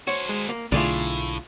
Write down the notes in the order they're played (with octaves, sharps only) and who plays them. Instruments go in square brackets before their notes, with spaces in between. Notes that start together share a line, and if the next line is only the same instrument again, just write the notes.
[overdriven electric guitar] F#4 C5 [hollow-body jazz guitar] C#5
[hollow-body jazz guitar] G#3
A#3
[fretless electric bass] B1 D3 A3 [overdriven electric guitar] A2 [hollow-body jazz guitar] F4 G#4 D5